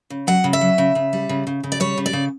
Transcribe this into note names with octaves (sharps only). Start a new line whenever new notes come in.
C#3
F#3 F#5
C#3
E5
F#3
C#3
C#3
G3
C#3
C#3
C#3
D5
G3 C#5
C#3
D5
C#3